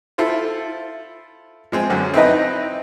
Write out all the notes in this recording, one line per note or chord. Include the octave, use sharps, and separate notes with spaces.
E4 F4 A4 C5
F3 G#3 C4
F#2 D3
C4 D#4 E4 B4 D#5